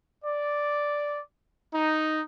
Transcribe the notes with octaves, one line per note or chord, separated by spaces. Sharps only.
D5
D#4